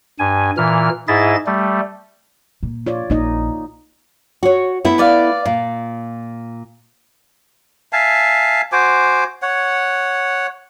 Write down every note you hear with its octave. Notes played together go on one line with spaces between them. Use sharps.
G2 G#5
A#2 E3 F6
G#2 E4 G#4 D#5 E5 A6
G3 A3
A#2
F4 C#5 D5
A#1 A#3 D#4 D#5
F#4 C#5
A3 B3 E4
B4 D5 F5
A#2 F4
E5 F5 G#5 A5
F#4 C5 G#5 D6
C#5 F#5